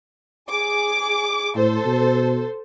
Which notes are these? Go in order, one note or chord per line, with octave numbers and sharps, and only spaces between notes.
G#4 D6
A2 A4 C5
B2